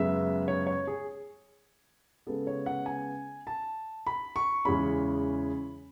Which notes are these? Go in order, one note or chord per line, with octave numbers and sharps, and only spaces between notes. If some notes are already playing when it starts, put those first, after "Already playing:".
Already playing: F#2 C#3 G#3 B3 E5
C#5
C#5
G#4
C#3 G#3 B3 A4
C#5
F#5
G#5
A5
B5
C#6
E2 C#3 G#3 C#4 B5